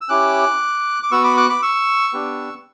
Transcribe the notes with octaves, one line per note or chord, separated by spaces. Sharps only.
E6
C#4 E4 G4 D6 F#6
D6
B3 F#4 C#6 E6
B5 D6
D6 F#6
B5 D6
C#6 E6
B3 D4 G4